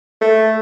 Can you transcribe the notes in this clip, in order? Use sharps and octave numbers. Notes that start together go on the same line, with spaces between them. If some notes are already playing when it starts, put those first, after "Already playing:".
A3